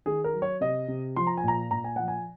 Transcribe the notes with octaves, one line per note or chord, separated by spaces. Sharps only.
D#3 G#4
A#4
F#3
C#5
C3 D#5
C3
F3 C6
A#5
G#5
A#2 A#5
A#2 A#5
G#5
F3 F#5
G#5